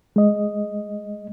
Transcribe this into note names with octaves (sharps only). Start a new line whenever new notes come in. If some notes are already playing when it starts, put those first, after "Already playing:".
G#3 D#5